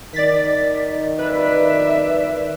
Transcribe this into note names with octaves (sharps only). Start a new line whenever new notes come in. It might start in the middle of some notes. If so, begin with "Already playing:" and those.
D#3 D5 A6 B6
B4 D5 E5